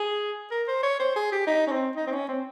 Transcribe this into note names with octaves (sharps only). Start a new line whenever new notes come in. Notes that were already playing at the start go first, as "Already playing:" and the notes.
Already playing: G#4
A#4
C5
C#5
C5
G#4
G4
D#4
C#4
C4
D#4
C4
C#4
C4